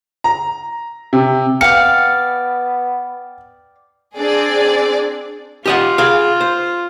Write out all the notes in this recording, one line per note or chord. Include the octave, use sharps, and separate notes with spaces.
A#5
C3
B3 D5 F5 G5 C#7
C4 D4 G#4 D5
F4 G4 D#5 F#5
G#4 F5
C5